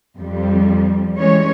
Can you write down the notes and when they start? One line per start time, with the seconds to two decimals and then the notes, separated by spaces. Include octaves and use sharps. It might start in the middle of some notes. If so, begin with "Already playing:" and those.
0.16 F2 G3
1.17 E3 G3 G#3 C#4 C#5